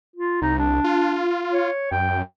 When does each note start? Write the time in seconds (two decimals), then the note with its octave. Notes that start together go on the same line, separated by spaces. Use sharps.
0.16 F4
0.42 C2 D#4
0.58 D4
0.84 F4
1.52 C#5
1.91 F#2 G5